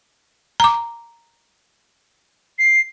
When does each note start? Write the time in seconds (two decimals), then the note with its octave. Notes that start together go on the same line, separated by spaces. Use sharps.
0.60 A#5 D6
2.59 C7